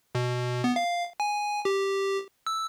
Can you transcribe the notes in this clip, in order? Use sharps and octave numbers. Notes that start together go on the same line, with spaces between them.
B2
B3
F5
G#5
G4
E6